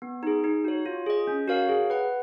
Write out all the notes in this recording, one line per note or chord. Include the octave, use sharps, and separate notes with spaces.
B3
D#4 G#4
D#4
F#4 C#5
F4
G#4 D#5
C#4
F#4 A#4 C#5 F5
G#4
B4 F#5